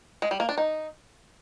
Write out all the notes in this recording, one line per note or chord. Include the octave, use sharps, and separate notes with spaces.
G#3
G3
A#3
D4
D#4